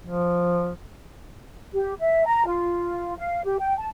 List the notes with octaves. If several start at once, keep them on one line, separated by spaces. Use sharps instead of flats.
F3
G4
E5
A#5
F4
F5
G4
G5
A5